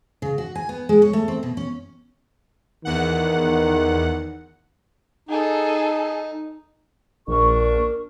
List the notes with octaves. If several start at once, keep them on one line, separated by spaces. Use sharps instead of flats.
C#3
F#4
G#5
B3
G#3
C#5
A3
C4
B2
C#4
E2 D#3 F#5
D#4 G#4 A4
A#1 D4 A#4 C#6